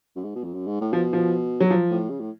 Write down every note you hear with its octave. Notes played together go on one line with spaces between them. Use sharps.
F#2
G#2
B2
F2
F#2
G#2
A2
B2 F3
F3
F#3
F3
A2
C#3
A2